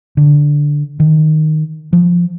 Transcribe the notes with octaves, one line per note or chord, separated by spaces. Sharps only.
D3
D#3
F3